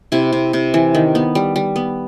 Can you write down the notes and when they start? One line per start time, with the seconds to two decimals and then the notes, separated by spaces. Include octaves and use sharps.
0.12 C3 E4
0.33 C3
0.53 C3
0.74 E3
0.95 D#3
1.15 B3
1.35 G3
1.56 G3
1.76 B3